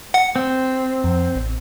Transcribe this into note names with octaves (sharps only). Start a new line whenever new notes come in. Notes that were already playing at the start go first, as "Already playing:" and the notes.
F#5
C4
F2
A1